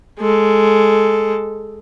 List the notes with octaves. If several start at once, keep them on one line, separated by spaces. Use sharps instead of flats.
G#3 A4